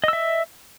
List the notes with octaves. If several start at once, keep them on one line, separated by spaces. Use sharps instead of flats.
D#5 E5 E6